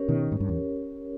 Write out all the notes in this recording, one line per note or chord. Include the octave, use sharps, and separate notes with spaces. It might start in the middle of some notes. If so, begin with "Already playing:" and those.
Already playing: C#4 G4 A#4 C#5
B2 D#3
G#2
G2
E2